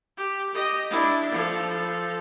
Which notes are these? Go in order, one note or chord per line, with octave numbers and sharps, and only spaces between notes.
G4
G4 D#5
D4 E4
F3 A4